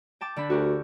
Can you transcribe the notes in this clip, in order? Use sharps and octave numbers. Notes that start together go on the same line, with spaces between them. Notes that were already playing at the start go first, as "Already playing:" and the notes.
G5 A5 D6
D3 D4 B5
D2 F#4 G4 A#4